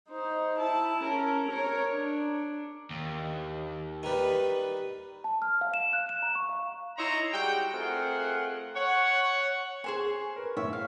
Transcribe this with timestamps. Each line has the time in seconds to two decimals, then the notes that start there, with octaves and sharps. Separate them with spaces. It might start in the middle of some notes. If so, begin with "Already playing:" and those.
0.11 D#4 C5
0.59 E4 A5
1.04 C#4 A#4
1.49 A#4 C#5
1.91 D4
2.90 D#2
4.03 D#3 G3 B4
5.24 A5
5.42 F6
5.61 F5
5.74 E7
5.93 F#6
6.09 E7
6.22 A#5
6.35 C#6
6.49 F5
6.97 D#4 E4 C#5 A#5 C6
7.33 G3 G#3 F#4 G5
7.72 A3 C4 F4 G#4 A#4 F#5
8.75 C#5 F#5
9.84 G#4 C5 C#5 G#5 C#6
10.36 A#4 B4
10.57 A2 C#5 E5 E6
10.73 F5